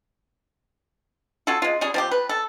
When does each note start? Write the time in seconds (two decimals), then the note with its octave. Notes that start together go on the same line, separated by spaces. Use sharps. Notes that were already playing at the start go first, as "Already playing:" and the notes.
1.47 C#4 F4 F#4 A4
1.62 G#3 F4
1.81 G3 C#4 G#4
1.94 F3 C4 G4
2.11 B4
2.29 A4